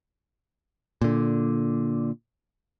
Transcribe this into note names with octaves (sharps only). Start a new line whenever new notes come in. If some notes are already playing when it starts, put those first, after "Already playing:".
A#2 D3